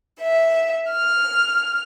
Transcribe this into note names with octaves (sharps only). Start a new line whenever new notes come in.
E5
F6